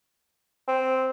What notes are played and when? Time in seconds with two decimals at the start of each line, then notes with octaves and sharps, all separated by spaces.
0.68 C4